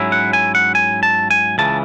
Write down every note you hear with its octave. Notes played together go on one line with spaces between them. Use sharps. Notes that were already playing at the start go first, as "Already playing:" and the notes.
Already playing: G#2 F#3 C#4 E4
F#5
G#5
F#5
G#5
A5
G#5
C#2 C#3 E3 A5